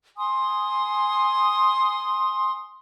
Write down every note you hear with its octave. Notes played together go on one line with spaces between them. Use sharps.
G#5 C6 D#6